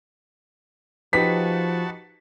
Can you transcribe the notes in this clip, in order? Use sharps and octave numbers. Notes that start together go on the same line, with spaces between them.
F3 D#4 F#4 G4 B4 A5 B6